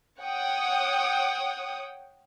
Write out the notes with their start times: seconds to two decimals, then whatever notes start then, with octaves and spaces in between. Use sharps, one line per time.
0.21 C#5 F#5 G5 D#6